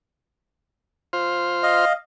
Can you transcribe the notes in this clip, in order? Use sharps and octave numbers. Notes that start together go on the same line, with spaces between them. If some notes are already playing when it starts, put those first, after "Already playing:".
F4 C5
D#5 F5